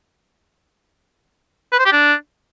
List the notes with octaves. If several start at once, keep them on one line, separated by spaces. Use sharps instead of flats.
B4
C5
G4
D4